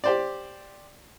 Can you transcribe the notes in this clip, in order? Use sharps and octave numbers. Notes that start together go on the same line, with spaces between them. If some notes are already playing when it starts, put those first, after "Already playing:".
G4 C5 D5